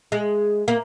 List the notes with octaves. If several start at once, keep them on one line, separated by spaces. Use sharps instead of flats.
G#3
A#3